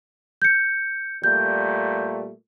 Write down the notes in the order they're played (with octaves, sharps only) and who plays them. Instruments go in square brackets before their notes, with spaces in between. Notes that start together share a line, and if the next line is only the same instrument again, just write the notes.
[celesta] G6 C#7
[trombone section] A#2 G3 A3 [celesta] G6